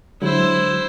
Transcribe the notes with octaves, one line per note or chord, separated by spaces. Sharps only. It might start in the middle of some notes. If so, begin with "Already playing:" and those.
D3 F#3 G#3 E4 C5